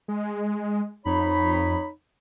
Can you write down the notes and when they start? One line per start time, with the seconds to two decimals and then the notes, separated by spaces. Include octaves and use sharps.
0.08 G#3
1.06 F2 D#4 C#5 B5